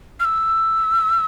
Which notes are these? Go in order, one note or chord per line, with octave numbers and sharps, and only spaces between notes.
F6
E6